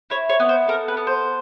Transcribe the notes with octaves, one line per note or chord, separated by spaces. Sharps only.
E4 C#5
C#5
B3
C5
A4 A#4
B4
B3
C5